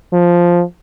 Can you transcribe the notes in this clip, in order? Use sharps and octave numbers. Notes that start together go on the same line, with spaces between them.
F3